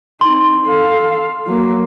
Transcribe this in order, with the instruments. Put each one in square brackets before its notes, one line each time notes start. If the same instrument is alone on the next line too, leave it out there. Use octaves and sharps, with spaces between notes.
[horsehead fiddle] C4 D#4 [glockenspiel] C6
[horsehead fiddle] A4 F5
F#3 A#3